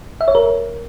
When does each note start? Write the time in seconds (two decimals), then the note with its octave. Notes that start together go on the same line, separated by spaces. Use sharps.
0.21 E5
0.28 C#5
0.35 A#4